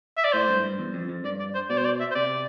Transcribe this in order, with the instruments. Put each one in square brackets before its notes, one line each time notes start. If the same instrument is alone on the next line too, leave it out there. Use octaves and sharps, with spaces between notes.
[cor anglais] E5
D5
[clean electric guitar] A2 [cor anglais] C5
[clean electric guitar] G2
G2
E2
F2
F2
[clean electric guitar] G2 [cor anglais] D5
[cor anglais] D5
C5
[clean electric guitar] B2 [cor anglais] D5
[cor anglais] C5
D5
E5
C5
[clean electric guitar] C3 [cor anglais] D5